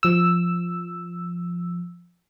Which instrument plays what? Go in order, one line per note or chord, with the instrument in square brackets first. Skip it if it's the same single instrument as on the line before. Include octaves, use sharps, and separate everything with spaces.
[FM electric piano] F3 E6